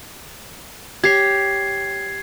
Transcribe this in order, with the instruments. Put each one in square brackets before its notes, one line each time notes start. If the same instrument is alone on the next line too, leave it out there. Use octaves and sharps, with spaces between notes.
[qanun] G4 C#5 [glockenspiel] G#6 C7